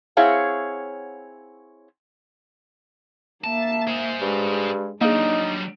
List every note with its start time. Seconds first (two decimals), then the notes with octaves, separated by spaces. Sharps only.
0.17 C4 E4 G#4 C#5 F5 F#5
3.44 A#3 E5 A5
3.87 G#4 C5
4.22 G2 G#3
5.01 F#3 G3 A#3 D4 D#4 G#4